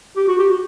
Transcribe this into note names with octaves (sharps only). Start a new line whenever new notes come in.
G4
F#4
G4
F#4